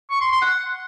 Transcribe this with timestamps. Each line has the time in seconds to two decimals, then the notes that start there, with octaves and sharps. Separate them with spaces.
0.10 C#6
0.21 C6
0.31 C6
0.42 F#5